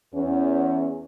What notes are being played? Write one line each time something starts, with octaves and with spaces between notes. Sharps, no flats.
E2 C#4